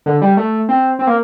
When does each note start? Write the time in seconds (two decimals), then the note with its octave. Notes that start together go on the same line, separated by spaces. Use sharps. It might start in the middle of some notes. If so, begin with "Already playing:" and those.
0.06 D3
0.22 G3
0.37 A3
0.69 C4
0.99 C4
1.07 A#3